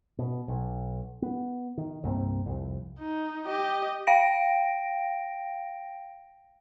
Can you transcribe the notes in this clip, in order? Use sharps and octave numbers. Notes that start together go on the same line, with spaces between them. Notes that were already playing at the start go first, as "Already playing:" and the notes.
B2
B1
B3
D#3
C2 G2 A#3 C4
C2 F2
D#4
G4 D#5
F5 G5 A#6 D7